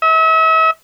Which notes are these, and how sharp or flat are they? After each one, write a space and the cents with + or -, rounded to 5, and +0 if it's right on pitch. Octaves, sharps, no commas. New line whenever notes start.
E5 -40